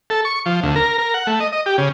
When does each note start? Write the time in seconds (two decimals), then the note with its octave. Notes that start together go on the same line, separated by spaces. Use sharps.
0.10 A4
0.25 C#6
0.46 F3
0.63 D2
0.76 A#4
0.98 A#4
1.14 F#5
1.27 A3
1.40 D#5
1.53 D#5
1.66 G4
1.78 C#3